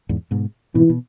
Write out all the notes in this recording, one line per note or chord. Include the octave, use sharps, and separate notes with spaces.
E2 G#2
G#2 B2
G#2 B2 E3
B2